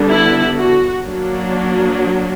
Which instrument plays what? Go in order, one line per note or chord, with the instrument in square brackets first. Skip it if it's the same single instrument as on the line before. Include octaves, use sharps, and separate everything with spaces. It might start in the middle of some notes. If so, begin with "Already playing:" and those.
Already playing: [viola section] D3 G3 B3 D4
E4
F#4
F#3 A#3 D4